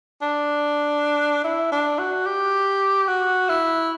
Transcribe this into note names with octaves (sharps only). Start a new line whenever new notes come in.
D4
E4
D4
F#4
G4
F#4
E4